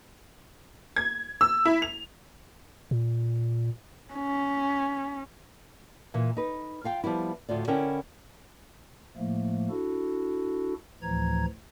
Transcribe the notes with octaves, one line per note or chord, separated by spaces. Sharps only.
G#6
E6
E4
F7
A#2
C#4
A#2 E3
D#4 B4
F4 F5 G5
F3 G3 B3 E4
D2 A2 F4 D5
D3 C#4 E4 A#4 C#5 G5
A2 F3 A3 A#3
D4 E4 F#4 A4
D2 A2 E3 F3 A#5 G#6